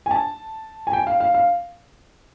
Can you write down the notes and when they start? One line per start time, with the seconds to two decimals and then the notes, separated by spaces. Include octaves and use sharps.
0.06 G#5
0.11 A5
0.87 G#5
0.93 G5
1.07 F5
1.20 F5
1.34 F5